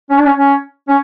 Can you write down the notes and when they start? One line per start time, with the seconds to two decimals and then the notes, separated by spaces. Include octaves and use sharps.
0.10 C#4
0.18 D4
0.25 C#4
0.37 C#4
0.88 C#4